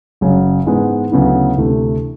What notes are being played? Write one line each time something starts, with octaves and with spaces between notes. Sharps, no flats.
F#1 F#2 C#3 F#3
G#2 E3 G#3 B3
D2 C#3 F#3 B3 E4
D2 C3 E3 A3